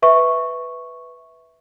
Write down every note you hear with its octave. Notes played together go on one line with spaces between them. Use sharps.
B4 E5 C#6